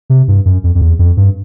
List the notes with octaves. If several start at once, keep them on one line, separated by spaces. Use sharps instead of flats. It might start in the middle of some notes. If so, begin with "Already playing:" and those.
C3
G2
F#2
F2
F2
E2
F2
G2